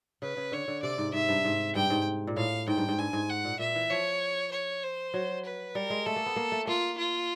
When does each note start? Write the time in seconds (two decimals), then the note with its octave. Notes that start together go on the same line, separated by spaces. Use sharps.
0.22 C#3 B4
0.37 C#3
0.52 D3 C#5
0.68 D3
0.83 C3 D5
0.98 G#2
1.13 G#2 E5
1.29 G2
1.45 G#2
1.75 G2 G5
1.90 G#2
2.27 A#2
2.37 A2 F5
2.68 G#2 G5
2.78 G2
2.89 G#2
2.99 G2 G#5
3.13 G#2
3.29 F#5
3.45 A#2
3.59 A#2 E5
3.75 E3
3.90 F3 C#5
4.52 C#5
4.83 C5
5.14 F#3
5.45 B4
5.75 G3 A#4
5.90 G#3
6.06 A3 A4
6.16 A#3
6.26 B3
6.36 A#3
6.52 A3
6.67 A#3 F4
6.98 F4